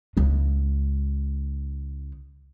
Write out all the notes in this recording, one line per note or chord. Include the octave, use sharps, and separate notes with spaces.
C#2 G#3